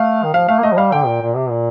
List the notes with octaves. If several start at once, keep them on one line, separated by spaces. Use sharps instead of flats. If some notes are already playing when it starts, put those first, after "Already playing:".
Already playing: A3 F5
D#3
F3 F5
A3 F5
A#3
A3 D#5
F3
G3 F5
D3 G5
A#2
A#2
C3
A#2